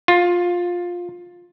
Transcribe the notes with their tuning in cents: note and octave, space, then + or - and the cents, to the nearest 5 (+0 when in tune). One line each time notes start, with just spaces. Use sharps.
F4 +15